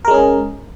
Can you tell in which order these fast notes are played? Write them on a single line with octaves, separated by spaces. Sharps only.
A#4 G#3 C#4 G#4